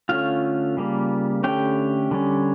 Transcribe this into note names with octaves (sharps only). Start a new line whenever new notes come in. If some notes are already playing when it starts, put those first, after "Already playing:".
D3 A3 C#4 F4 F5
C#3 G3 A#3
D3 A3 C#4 G4 G5
D3 G3 C#4